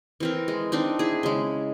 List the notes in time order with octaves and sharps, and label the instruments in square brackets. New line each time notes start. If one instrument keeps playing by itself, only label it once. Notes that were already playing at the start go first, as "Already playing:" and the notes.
[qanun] E3 C4 A#4
G#3
C4 D4 D#4
E4 G#4
C#3 G#3